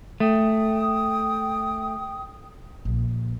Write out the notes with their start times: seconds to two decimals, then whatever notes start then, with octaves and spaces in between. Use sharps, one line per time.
0.20 A3 G5 D#6
2.85 A#1